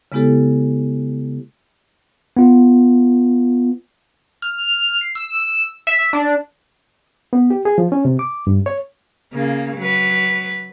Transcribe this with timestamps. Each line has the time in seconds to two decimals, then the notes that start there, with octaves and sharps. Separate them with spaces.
0.12 C#3 G#3 B3 E4 G4 A4
2.37 B3 F4
4.42 F6
5.01 C7
5.15 E6
5.87 E5
6.13 D4
7.33 B3
7.50 G4
7.65 G#4
7.78 F3
7.92 C#4
8.05 C3
8.19 D6
8.47 G2
8.66 C#5
9.32 C#3 A#3
9.77 F#3 B4